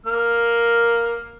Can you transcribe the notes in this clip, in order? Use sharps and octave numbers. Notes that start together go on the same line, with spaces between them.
A#3 F6